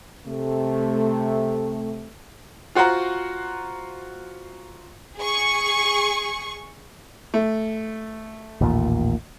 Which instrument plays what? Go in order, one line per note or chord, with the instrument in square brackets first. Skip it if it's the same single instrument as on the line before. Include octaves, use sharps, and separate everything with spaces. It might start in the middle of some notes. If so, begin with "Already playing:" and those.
[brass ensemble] C3 A3
[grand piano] F4 F#4 C5 F#5 A#5
[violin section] G#4 C#6
[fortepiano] A3
[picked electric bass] A1 D#2 A#2